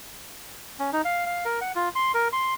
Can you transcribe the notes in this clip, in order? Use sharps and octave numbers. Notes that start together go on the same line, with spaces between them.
C#4
D#4
F5
F5
A#4
F#5
F4
C6
A#4
C6